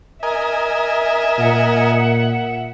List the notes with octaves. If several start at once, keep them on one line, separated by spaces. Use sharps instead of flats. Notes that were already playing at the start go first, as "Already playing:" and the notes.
A#4 D#5 E5 G#5
A#2 F#5